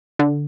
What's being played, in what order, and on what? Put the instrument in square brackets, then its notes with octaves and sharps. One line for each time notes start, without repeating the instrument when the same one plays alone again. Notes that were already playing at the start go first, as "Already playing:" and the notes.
[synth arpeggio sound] D3